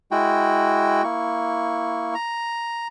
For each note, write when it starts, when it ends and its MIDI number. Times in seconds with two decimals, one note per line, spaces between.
0.11 1.03 56
0.11 1.03 64
0.11 1.03 66
0.11 1.03 79
1.04 2.14 58
1.04 2.14 64
1.04 2.14 85
2.15 2.88 82